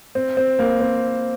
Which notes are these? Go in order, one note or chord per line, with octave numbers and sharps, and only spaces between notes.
C4
C4
A#3
C4